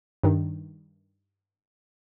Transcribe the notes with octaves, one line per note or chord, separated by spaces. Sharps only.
G2 D#3